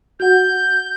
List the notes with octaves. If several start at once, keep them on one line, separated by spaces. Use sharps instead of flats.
F#4 F#5 G6